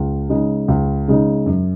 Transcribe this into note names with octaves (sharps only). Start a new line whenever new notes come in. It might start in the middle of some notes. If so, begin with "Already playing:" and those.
Already playing: C#2
C#3 G#3 D#4
C#2
C#3 G#3 D#4
F#2